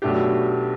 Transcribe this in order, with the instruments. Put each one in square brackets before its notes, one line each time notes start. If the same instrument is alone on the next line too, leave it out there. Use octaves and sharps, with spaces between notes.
[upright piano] B1 B2 A3 D4 G4